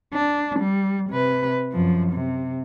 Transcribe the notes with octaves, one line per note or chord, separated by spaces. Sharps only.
D4
G3
C3 B4
F#2 F3
C3